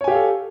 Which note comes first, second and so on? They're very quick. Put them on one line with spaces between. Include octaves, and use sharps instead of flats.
C#5 G#5 G4 F5 A4